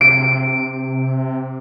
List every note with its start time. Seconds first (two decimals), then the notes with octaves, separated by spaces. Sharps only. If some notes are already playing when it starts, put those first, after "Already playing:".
0.01 C3 D7